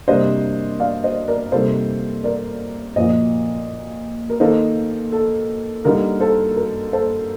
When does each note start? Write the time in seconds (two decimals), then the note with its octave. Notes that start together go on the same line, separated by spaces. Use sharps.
0.08 C3 G3 A#3 D4 C5 D#5
0.80 D5 F5
1.04 C5 D#5
1.28 A#4 D5
1.51 C3 G3 A#3 D#4 A4 C5
2.24 A#4 D5
2.96 A#2 F3 A#3 C5 D#5
4.30 A#4
4.40 D#3 A#3 D#4 A4 C5
5.12 A4
5.85 D3 G3 A#3 D#4 A#4
6.20 A4 C5
6.56 A#4
6.93 A4 C5